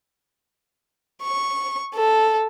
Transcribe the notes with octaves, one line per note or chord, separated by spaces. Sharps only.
C#6
A4